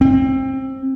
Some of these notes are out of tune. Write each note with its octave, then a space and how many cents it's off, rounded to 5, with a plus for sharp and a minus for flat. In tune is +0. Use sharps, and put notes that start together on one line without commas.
C4 +25